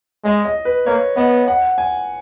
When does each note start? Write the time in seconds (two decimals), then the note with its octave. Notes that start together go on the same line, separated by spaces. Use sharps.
0.25 G#3 D#5
0.45 D#5
0.65 B4
0.86 A#3 C#5
1.16 B3 D#5
1.48 F#5
1.78 G#5